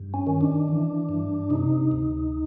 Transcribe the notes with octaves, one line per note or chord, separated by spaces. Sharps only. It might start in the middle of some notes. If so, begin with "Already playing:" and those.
Already playing: G2
C#4
D#3
D4
E3
G2
C3 D#4
D2